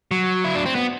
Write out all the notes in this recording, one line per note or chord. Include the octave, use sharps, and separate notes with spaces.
F#3
E4
D4
C4
B3